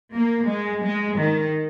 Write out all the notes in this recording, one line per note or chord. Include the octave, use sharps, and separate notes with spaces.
A#3
G#3
G#3
D#3